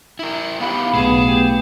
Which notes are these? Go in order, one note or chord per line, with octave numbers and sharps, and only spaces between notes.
E4 A#4
B3 E4 G4 F5 B5
B1 A3 B3 G#4
G4 G5